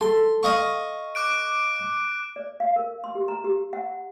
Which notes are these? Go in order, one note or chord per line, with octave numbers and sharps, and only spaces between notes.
A4 C6
D#5 F5 C#6
D6 F#6 D7
D5
F5
A#4
C6
G4
A#5
G4
F#5